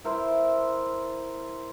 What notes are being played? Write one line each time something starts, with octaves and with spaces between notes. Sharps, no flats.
E4 A#4 C5 E5